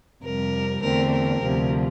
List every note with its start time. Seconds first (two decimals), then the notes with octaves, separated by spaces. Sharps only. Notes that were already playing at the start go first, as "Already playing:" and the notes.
0.22 F2 C3 G3 A#4
0.82 E2 D3 A3 C4 A#4
1.11 A#4
1.42 D2 C3 F3